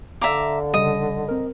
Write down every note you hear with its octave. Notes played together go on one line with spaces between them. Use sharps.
D3 D5 E5 F5 A#5 D6
C#3 G3 D#5
C4 A#4